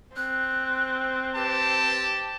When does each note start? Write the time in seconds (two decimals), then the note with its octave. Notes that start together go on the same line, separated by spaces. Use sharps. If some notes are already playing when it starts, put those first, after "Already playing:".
0.16 C4 F#6
1.35 G4 B4 A5